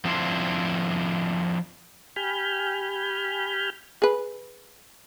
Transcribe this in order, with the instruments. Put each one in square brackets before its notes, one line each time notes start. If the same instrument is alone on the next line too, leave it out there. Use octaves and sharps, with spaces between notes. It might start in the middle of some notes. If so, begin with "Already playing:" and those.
[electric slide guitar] F3 C4 D4 E4 C5
[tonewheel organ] G4 G#5 B5 F6 G6
[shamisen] G#4 B4